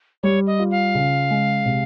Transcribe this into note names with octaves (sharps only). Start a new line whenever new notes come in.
G3 C#5
D#5
F4
F5
C#3
G#3
C3